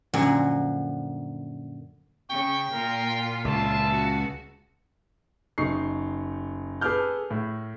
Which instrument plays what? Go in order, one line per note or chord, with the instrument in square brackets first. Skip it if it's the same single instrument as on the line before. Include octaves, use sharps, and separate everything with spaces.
[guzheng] F#2 A#2 D3 F3 F#4 F#5
[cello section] C#3 [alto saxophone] G5 [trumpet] C#6
[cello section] A#2 F4 [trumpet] A#4
[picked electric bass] C#2 [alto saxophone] E5 [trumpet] A5
[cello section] F#4
[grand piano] F#1 D#4 C#6 C7
G#4 A4 B4 D6 F6 G6
A2